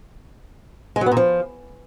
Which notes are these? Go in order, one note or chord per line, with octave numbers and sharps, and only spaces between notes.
G#3
F#3
B3
A#2
F3